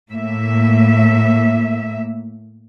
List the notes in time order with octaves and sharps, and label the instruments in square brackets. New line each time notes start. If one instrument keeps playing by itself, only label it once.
[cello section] A2 A#3 E5